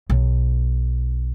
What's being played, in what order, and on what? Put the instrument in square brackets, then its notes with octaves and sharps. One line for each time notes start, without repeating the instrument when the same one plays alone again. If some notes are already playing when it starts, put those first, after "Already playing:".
[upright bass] B1